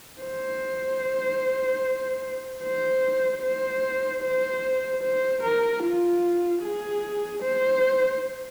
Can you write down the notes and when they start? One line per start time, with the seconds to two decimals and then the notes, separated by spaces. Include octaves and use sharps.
0.21 C5
2.62 C5
3.42 C5
4.22 C5
5.03 C5
5.42 A#4
5.83 F4
6.62 G#4
7.43 C5